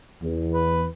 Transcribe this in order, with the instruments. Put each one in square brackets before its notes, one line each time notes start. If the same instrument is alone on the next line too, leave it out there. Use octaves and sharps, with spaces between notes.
[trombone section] E2
[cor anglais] B4